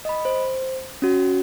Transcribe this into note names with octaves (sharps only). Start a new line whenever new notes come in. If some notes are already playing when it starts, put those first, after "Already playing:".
D#5 B5
C5
C#4 F#4